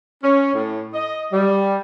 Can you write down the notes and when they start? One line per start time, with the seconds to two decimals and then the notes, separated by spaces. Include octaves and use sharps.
0.23 C#4
0.54 A2
0.94 D#5
1.32 G3